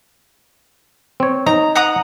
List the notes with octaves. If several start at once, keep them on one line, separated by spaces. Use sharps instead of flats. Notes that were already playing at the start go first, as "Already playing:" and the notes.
C4 C#5
D#4 A#5
F#5 A#5 D#6